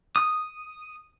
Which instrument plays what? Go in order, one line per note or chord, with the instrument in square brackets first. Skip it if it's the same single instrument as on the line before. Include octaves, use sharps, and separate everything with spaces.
[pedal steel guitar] D#6